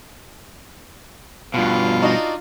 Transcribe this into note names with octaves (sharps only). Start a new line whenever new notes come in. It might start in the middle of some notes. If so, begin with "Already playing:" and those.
G2 B2 F4
D4 D#4 F#4